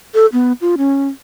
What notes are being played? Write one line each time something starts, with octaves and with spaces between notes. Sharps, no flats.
A4
B3
F4
C#4